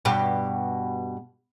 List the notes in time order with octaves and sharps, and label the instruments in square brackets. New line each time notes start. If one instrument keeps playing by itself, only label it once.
[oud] G2 B2 G4